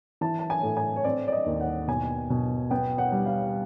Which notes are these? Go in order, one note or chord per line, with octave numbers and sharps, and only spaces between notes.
E3 A5
A5
G#5
A2
G#5
C#5
C4 D5
D5
D#5
D#2
F#5
B2 G#5
B2
B3 G5
F#5
G3
F5